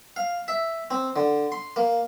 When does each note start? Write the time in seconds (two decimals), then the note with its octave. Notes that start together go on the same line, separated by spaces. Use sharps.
0.16 F5
0.48 E5
0.90 C4
1.16 D3
1.52 C6
1.76 A#3